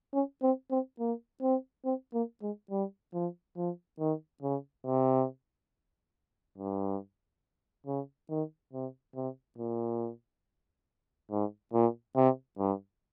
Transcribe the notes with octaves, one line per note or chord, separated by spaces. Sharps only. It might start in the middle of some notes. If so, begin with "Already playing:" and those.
C#4
C4
C4
A#3
C4
C4
A#3
G#3
G3
F3
F3
D#3
C#3
C3
G2
C#3
D#3
C3
C3
A#2
G#2
A#2
C3
G2